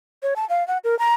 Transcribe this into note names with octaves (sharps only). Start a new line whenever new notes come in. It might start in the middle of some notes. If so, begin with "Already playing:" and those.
C#5
A5
F5
F#5
A#4
A#5